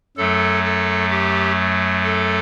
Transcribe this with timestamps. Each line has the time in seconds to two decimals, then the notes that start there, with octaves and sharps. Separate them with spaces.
0.17 F#2 F#3 A3 A4
0.64 A4
1.10 G4
2.04 A4